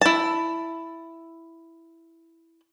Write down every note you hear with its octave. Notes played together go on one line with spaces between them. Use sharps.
E4 A5